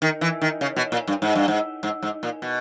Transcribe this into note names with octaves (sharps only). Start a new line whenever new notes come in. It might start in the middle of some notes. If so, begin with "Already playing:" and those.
D#3
E3
D#3
C#3
B2
A#2
G2
G#2
G2
G#2
G#2
G#2
A#2
B2